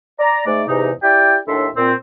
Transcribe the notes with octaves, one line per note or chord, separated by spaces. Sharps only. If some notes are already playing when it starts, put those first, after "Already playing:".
D5 A#5
G#2 A3 D5
E2 G#2 C3 D#4
E4 G4 D5 G5
D#2 A2 D4 A4 E5 C6
A#2 C4